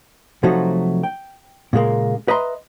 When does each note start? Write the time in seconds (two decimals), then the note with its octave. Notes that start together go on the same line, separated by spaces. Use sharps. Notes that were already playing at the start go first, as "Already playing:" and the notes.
0.43 C3 F3 F#3 A3 D#4 F#4
1.03 G5
1.73 A#2 C#3 G#3 A#3
2.28 B4 D#5 E5 A#5 C6